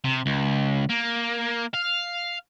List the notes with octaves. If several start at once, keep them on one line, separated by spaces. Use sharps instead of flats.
C3
C#2
A#3
F5